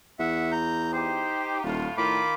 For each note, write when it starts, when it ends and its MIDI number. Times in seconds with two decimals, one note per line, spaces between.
0.19 1.29 40
0.19 0.52 76
0.19 0.52 78
0.52 0.91 82
0.52 0.91 91
0.93 1.61 63
0.93 1.61 67
0.93 1.58 72
1.64 1.87 27
1.64 1.96 45
1.64 1.96 65
1.97 2.21 45
1.97 2.34 51
1.97 2.34 65
1.97 2.34 83
1.97 2.34 86